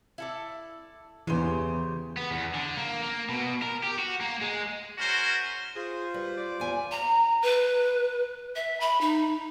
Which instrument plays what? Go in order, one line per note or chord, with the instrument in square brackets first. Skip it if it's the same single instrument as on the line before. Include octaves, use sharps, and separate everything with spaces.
[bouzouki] E4 A4 D5
[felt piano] E2 D#7 [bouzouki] C#3 G4 C5 [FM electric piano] E3
[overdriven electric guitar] B3
E2
D3
A#3
A#3
B2
A#4
G4
F#4
A#3
G#3
[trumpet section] C#4 F#4 A#4 C5
[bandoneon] F4 C5 [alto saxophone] G#4
[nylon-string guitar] G3 [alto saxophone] B4
[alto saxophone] D5
[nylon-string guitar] E2 G#5
[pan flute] A#5
B4
E5
B5
D#4